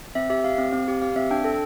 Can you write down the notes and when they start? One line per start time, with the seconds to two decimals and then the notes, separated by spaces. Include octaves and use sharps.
0.15 C4 E5
0.30 G4 E5
0.44 G4 F5
0.58 C4
0.73 C4
0.88 G4
1.02 G4 F5
1.16 C4 E5
1.31 D4 G5
1.44 A4